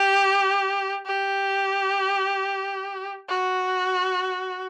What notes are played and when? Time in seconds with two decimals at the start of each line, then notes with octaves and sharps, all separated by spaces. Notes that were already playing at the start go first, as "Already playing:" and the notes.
Already playing: G4
1.06 G4
3.29 F#4